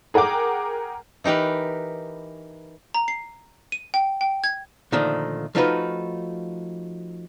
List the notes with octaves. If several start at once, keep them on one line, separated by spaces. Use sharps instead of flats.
G#4 A#4 F#5 G5 D6
E3 D#4 G4 A#4 B4
A#5
C7
D#7
G5
G5
G#6
A#2 D3 D#3 F3 A3
F3 A3 D#4 F4 F#4 B4